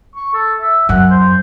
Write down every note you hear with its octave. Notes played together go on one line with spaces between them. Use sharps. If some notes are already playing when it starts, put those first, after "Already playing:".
C#6
A4
E5
F#2 F#5
C5